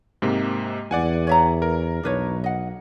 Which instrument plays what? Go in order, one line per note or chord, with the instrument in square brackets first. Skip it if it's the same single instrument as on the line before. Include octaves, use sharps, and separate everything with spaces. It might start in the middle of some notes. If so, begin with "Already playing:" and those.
[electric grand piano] G#2 C3 A#3
[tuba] E2 [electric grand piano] D5 F#5 G#5
[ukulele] C#5 E5 A#5
[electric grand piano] A#4
[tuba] B1 [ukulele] D4 B4 C#5
[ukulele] D#5 F#5